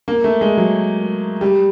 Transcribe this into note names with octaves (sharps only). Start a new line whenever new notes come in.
A#3
A3
G#3
F#3
G3